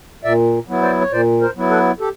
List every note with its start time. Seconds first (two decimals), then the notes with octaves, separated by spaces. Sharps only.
0.24 A#2 D5 E5
0.68 F#3 B3 E4
0.82 C5 D5
1.01 C#5
1.11 A#2 C5 D5
1.41 A#4 C5
1.56 F#3 B3 E4
1.70 A4 B4
2.00 G4 A4